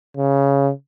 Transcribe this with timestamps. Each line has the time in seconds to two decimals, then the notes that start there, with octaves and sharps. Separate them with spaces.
0.17 C#3